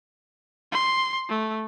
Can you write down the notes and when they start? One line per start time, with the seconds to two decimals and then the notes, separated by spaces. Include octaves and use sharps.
0.72 C6
1.29 A3